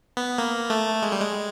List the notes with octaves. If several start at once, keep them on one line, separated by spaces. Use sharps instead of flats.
B3
A#3
A3
G#3
G3
G#3